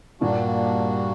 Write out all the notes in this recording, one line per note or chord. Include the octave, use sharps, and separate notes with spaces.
G2 A#2 G3 A#3 D4 F#4